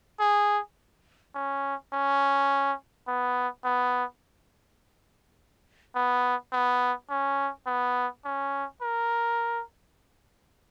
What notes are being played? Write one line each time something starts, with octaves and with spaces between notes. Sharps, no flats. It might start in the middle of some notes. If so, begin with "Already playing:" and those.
G#4
C#4
C#4
B3
B3
B3
B3
C#4
B3
C#4
A#4